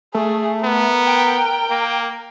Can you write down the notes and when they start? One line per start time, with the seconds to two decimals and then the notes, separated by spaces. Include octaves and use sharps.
0.15 A3 G#4
0.64 B3 A#4
1.07 G5
1.71 A#3